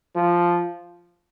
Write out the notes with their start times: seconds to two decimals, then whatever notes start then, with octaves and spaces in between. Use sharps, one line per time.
0.16 F3